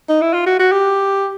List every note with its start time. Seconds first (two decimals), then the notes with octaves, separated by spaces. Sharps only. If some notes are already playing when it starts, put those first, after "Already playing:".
0.09 D#4
0.22 E4
0.34 F4
0.46 F#4
0.59 F#4
0.72 G4